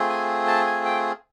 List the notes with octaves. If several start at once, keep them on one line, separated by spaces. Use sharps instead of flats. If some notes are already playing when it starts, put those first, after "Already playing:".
Already playing: A3 C4 F4 G#4
G#5
A5
G#5
G5